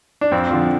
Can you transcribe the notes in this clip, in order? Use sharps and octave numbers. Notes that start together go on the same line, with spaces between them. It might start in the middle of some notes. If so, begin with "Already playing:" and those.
D4
F2 C4
D3 F3